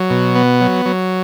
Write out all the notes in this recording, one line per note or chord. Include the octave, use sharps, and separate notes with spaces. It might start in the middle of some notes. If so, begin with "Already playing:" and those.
Already playing: F#3
B2
B3
F#3
F#3